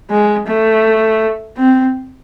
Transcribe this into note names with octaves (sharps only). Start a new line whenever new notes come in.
G#3
A3
C4